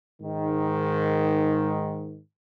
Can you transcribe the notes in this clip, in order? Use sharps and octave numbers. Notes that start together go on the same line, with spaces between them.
G#2 D#3